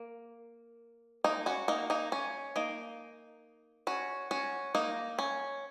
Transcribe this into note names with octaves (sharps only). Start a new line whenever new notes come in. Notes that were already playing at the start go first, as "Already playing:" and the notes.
Already playing: A#3
A#3 D#4
C#4 F#4
A#3 D#4
A#3 D#4
C#4
A#3 D#4
C#4 F#4
C#4 F#4
A#3 D#4
C#4